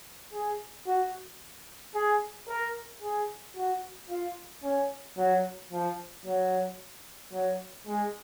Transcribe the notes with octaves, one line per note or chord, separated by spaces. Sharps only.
G#4
F#4
G#4
A#4
G#4
F#4
F4
C#4
F#3
F3
F#3
F#3
G#3